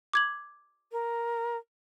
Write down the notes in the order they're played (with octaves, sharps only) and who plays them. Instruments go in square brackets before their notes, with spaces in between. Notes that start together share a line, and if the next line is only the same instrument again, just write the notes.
[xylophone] D6 G#6 F#7
[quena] A#4